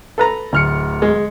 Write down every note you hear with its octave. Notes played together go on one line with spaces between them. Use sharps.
A4 B4 A#5
D1 D2 F6 C#7
G#3